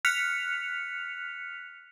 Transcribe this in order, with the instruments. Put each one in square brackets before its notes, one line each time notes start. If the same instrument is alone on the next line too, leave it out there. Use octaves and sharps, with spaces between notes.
[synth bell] F6 F#6 B6 C#7 F7